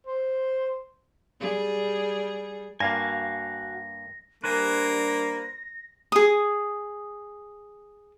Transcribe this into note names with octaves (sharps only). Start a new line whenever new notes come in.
C5
G3 G#4
G2 A#3 F#4 F5 G#5 A#6
G3 A#3 D4 B4 C5 G#5 A#6
G#4 D#6